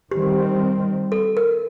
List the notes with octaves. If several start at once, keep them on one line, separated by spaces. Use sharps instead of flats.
D#3 G3 C4 G4
A4
A#4